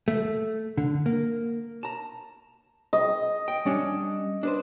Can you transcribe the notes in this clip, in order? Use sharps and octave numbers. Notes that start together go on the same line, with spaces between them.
A3
D3
A#3
A5 A#5
D#5
G5
G3 C#4 D4
D4 B4 C5